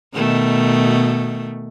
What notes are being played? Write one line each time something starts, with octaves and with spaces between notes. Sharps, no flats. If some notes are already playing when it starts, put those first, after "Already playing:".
B2 D#3 A3